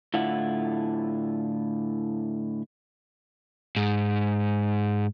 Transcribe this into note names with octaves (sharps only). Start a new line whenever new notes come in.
A2 D3 E4 F4 F#5
G#2